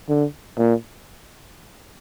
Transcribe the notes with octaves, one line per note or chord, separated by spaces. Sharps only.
D3
A#2